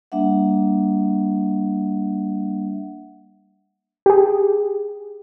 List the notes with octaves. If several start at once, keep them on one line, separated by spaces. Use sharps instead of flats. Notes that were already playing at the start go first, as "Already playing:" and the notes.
G3 A#3 D4 E5 F#5
G4 G#4